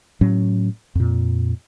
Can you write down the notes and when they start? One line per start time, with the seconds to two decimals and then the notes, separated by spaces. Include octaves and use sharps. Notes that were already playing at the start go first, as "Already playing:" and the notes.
0.21 A2 F#3 C#4
0.95 F2 A#2